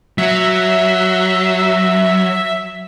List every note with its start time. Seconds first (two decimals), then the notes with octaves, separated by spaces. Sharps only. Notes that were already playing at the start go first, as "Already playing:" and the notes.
0.18 F#3 E5